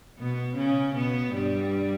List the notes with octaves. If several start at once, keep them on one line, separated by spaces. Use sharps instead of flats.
B2 B3
C#3 C#4
B2 B3
G2 G3